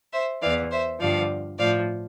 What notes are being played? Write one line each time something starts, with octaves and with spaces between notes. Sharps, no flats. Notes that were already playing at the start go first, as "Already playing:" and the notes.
C5 E5
E2 E3 D5 F5
C5 E5
G2 D3 F3 D5 F5
A2 F3 D5 F5